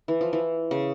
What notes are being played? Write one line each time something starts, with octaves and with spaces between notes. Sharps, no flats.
E3
F3
E3
C#3